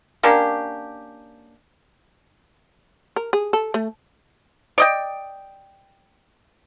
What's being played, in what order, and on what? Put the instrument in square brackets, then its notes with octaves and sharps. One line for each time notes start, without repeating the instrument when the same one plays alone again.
[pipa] A#3 C#4 D4 G4
[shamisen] A#4
G#4
A4
A3
[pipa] D5 D#5 G5